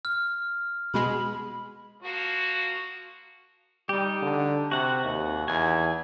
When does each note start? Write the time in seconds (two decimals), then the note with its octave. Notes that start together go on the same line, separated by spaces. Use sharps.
0.05 F6
0.94 B2 G#3 B5
2.03 F3 A#3 F#4
3.89 G3 D#4 G4
4.22 D3
4.71 C3 F#4 F#5
5.04 D#2
5.48 E2 G#5